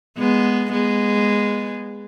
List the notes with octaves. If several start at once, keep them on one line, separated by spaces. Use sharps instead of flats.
G#3 B3
G#3 B3